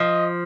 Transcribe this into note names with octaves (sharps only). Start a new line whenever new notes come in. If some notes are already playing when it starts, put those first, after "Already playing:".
Already playing: F3 D#5